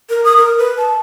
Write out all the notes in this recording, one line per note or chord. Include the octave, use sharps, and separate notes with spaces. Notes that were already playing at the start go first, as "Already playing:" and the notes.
A#4
D#6
A#4
B4
A5